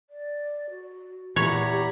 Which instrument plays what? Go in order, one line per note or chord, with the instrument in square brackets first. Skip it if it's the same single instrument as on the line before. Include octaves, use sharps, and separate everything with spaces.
[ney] D5
F#4
[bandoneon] E2 A#5 B5 [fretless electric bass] A#2 E3 [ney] G4 [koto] C#5